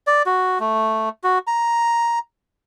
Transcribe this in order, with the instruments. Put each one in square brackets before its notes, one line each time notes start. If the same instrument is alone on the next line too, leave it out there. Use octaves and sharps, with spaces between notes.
[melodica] D5
F#4
A3
F#4
A#5